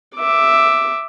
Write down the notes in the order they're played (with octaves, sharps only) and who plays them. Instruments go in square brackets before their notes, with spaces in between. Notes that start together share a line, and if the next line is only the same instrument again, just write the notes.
[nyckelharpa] E5 D6